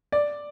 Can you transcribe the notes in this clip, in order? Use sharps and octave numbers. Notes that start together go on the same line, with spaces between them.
D5